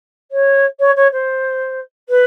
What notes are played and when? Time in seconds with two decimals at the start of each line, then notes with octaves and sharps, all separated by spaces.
0.31 C#5
0.79 C#5
0.96 C#5
1.12 C5
2.09 B4